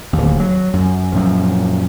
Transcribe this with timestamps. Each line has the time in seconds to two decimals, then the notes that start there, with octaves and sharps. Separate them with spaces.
0.13 D1 D#2
0.40 F#3
0.73 F#2
1.12 F#2 A#2 F3